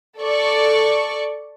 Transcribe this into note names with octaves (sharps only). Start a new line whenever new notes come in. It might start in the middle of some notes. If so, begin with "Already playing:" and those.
A4 D5 C#6